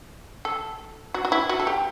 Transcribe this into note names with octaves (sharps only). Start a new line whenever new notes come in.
A4
F#4
F#4
E4
F#4
A4
G4